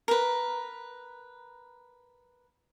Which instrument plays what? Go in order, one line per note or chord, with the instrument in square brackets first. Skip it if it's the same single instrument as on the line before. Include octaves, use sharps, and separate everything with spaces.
[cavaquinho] A#4 B4